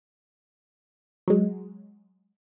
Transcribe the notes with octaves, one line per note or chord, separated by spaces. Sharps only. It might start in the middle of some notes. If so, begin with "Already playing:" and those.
F#3 G#3